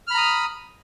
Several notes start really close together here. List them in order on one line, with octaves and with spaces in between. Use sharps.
F6 B5 A#5 D#6